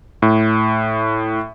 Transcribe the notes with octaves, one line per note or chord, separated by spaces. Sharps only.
A2